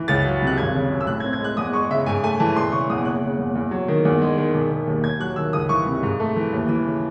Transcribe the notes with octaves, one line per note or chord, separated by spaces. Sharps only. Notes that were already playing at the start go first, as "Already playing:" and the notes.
Already playing: E3
C#2 A6
F#3
C3 F#6
G#1 G#6
C#3
F#2
E6
A2 F#6
G#6
C4
G#6
G#3 F#6
E2 D#6
G#3 C#6
C#3 E5
G#2 G#5
A3 G#5
E3 A5
E1 C6
C#3 C#6
E2 D#6
F#1 F#6
C#3
E2
E2
F#3
D#3
E2
G#3
D#3
E1
D#3
D#2
D#2 G#6
F#3 F#6
D#3 E6
C#2 D#6
E3 C#6
C3
G#2
A3
E3
D#2
E3
C#3